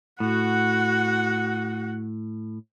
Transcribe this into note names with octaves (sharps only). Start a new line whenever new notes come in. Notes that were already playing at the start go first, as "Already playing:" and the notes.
A2 F#4 F#5